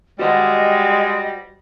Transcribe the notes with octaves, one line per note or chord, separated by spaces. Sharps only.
G3 G#3 F#4 C5 D#5 F#5